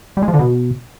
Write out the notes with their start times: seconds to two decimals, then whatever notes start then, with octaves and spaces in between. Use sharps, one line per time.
0.17 G3
0.22 G#3
0.28 F3
0.34 D3
0.39 B2